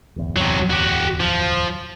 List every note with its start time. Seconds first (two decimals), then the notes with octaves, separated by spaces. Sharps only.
0.16 D1 G1 E2
0.36 C3 F#3
0.70 F#4 G4
1.20 F3